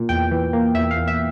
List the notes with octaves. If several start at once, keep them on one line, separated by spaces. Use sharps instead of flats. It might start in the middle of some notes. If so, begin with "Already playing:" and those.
Already playing: A#2
E2 G5
E3
A#3
E2 E5
F5
E2
E5